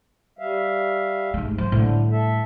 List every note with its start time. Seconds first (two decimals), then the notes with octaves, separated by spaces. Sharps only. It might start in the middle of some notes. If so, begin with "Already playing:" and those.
0.39 G3 E5 F5
1.34 G#2 A3
1.58 F#3 C5
1.72 A2 D3 G3
2.11 A4 E5